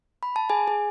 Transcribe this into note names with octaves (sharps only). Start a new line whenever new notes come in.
B5
A5
G#4 G#5
G#4